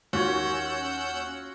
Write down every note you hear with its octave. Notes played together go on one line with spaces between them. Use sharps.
D#2 C#4 F4 F#4 C#5 F#5 E6 G6